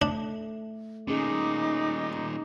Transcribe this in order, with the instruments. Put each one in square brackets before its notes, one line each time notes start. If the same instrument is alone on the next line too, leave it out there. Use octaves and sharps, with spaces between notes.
[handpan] A3 [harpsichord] D4
[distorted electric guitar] A#2 D#3 [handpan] C#4 G#4 [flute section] D#4 D6